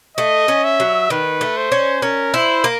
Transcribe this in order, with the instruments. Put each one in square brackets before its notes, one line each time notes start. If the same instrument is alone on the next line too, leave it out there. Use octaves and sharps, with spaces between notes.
[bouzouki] A3 [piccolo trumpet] D#5
[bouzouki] C#4
[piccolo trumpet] E5
[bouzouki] F#3
[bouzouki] D#3 [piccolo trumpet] B4
[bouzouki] A3
[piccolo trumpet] C5
[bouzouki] C#4
[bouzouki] C#4 [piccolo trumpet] A#4
[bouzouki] E4 [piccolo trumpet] C5
[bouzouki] A#3